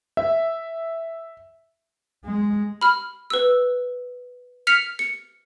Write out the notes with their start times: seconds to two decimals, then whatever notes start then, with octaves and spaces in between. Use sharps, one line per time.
0.17 E5
2.24 G#3
2.81 B5 F6
3.30 B4 E6
4.67 F6 B6 C#7 F7
4.99 C#7